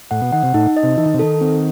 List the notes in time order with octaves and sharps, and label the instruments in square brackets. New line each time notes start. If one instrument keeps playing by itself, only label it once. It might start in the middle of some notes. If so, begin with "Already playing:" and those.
[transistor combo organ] A2 [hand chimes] F#5
[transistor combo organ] B2
[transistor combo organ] D#3 [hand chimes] F#5
[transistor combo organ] C3
[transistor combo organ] A2 [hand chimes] D#4
[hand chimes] D#5
[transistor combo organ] C3
[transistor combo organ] E3 [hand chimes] D#4
[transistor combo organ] D#3
C3
[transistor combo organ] D#3 [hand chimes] A4
[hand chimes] C4